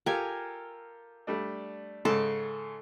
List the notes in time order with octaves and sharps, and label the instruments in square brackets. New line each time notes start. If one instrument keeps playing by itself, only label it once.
[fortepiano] F4 G4 A4 [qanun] A#4 G#5
[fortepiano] G3 A3 D4
[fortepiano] G#2 C#3 [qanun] A4